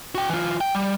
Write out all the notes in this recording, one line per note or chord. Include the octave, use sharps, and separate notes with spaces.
F#4 G5
E3 F4
G5
G3